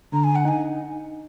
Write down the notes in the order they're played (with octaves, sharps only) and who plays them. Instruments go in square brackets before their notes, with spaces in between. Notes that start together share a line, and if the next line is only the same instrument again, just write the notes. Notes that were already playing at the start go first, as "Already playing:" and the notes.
[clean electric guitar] D3 [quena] A#5
[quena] G#5
F#5
[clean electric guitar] D#4 [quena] G#5